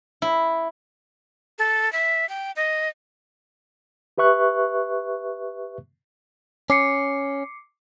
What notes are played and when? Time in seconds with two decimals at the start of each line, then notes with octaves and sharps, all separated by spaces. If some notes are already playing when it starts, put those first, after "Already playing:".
0.22 E4
1.59 A4
1.93 E5
2.29 G5
2.56 D#5
4.18 G4 B4 E5 C#6 F#6
6.70 C#4 D6 C7 C#7